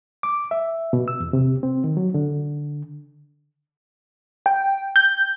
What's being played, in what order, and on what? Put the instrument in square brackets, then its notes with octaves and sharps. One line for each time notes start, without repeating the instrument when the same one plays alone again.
[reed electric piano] D6
E5
B2
E6
E2
C3
C4
D#3
F#3
D3
[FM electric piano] G5
G6